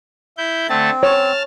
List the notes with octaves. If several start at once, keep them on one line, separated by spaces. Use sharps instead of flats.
E4 G6
D3 A3 C4 A5
C#5 A5 F6